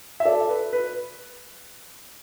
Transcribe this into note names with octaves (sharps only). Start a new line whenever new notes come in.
E5
A4 D5
B4
B4